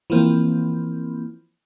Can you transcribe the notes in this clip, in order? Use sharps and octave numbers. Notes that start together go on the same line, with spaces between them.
E3 F3 A#3 C4